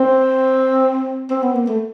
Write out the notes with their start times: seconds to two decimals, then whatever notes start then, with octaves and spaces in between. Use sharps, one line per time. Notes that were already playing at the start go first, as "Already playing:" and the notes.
Already playing: C4
1.30 C4
1.43 B3
1.55 A#3
1.67 A3